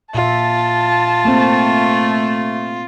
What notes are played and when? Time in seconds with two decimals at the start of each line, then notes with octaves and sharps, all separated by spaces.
0.15 A#2 F4 E5 A5
1.25 A3 A#3 C4